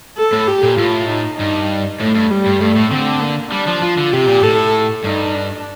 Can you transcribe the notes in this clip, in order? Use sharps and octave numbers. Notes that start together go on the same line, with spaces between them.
A4
A2
G4
A#2
A2 F4
D#4
G2 D#4
A2 A3
G2
G3
G2
G2 A3
A2
D3 C4
A#3
G3 D4
F3
F3 F4
D3
C3 G4
A#2
A2 A4
G2 D#4
D4